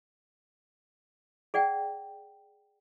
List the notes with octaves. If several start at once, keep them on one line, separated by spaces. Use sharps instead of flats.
G#4 D5 F#5 G5